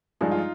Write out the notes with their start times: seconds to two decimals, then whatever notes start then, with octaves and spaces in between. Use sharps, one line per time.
0.21 G2 F3 G#3 D4 D#4
0.31 F4